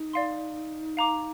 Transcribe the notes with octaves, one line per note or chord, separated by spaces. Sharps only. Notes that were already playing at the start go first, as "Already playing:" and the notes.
Already playing: D#4
D5 F5 C6
F5 A#5 D6